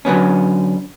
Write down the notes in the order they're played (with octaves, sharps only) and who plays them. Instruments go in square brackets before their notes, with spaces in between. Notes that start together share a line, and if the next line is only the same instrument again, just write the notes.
[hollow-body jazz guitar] D3 F#3 B3 C#4